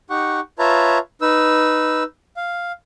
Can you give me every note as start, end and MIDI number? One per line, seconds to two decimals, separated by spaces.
0.10 0.40 63
0.10 0.40 67
0.10 0.40 78
0.10 0.40 85
0.59 0.98 65
0.59 0.98 71
0.59 0.98 73
0.59 0.98 76
0.59 0.98 81
0.59 0.98 82
1.21 2.03 63
1.21 2.03 71
1.21 2.03 88
2.37 2.72 77